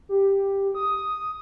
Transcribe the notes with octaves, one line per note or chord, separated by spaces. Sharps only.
G4
D#6